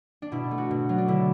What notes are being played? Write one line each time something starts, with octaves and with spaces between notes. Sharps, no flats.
D4
B2 E4
A3
F#4
B2
F#3
D4
D3 E4